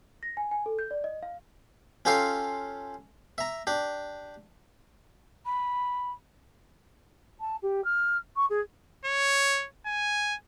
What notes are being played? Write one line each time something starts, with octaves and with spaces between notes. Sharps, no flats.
A#6
G#5
G#5
A4
G6
D5
D#5
F5
C#4 F4 G4 A4 F5 C6
E5 A#5
D4 G4
B5
A5
G4
F6
C#6
G#4
C#5
G#5